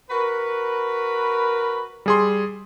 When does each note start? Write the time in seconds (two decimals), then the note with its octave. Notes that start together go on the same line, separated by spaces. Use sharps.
0.11 F#4 A#4 B4
2.06 G3 G#4 C6